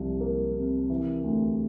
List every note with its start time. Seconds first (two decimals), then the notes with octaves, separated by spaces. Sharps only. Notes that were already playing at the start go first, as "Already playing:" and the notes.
Already playing: C2 F3
0.20 A#3
0.55 C3
0.90 E3
1.24 D2